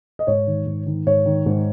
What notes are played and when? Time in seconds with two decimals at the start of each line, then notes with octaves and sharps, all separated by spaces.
0.19 D#5
0.27 G#2 C#5
0.47 D#3
0.67 G#2
0.87 D#3
1.06 G#2 C#5
1.26 D#3
1.46 G#2